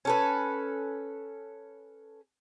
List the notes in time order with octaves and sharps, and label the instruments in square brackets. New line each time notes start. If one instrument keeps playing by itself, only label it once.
[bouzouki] C#4 A4 B4